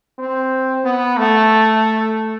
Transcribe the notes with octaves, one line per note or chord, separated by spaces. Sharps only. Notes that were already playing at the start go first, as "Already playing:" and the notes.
C4
B3
A3